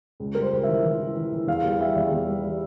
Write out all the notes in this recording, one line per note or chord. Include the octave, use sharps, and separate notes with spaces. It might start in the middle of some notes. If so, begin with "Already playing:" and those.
C#2
G3 A#4
C5
C#2
E3 E5
E3
E3
E3
E3
E2 F5
G3
G3 E5
E2
E2
G3
G3